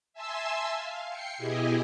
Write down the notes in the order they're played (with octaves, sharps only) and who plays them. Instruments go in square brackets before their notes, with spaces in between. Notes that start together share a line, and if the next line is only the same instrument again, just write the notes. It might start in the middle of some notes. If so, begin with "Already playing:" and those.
[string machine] E5 G#5 A5 C6 E6
F5
G5 C7 C#7
B2 E4 G4 G#4 D#5 G#5